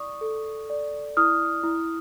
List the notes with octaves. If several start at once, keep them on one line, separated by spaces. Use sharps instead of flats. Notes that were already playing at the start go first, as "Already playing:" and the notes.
Already playing: E4 D5 C#6 D#6
A4
D5
E4 D#6 F6
E4